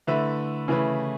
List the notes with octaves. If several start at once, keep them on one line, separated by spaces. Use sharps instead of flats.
D3 A3 E4 B4 E5
C#3 E3 A3 E4 B4